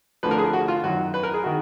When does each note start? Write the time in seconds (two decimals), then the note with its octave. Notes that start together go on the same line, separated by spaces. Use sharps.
0.23 D2 D3 F3 B4
0.31 A#4
0.38 G#4
0.53 F#4
0.68 F4
0.83 F#2 D#3 F#3 F#4
1.14 B4
1.23 A#4
1.34 G#4
1.44 D#3 F#4